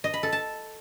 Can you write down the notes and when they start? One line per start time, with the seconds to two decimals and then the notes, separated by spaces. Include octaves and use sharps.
0.04 D#5
0.14 B5
0.23 A4
0.32 A5